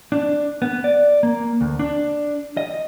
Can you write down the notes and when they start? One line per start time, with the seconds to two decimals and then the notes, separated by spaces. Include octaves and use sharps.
0.12 D4
0.62 B3
0.84 D5
1.23 A#3
1.61 D2
1.79 D4
2.57 D#5